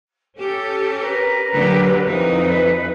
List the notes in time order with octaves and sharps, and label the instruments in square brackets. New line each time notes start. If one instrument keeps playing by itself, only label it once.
[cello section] C#4 G4 [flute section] A4
[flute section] A#4 B4
[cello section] D3 F#3 G4
F2 E3 D#4
[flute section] B4